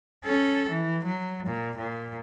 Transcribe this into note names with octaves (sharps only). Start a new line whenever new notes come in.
C#4 A4
E3
F#3
A#2
A#2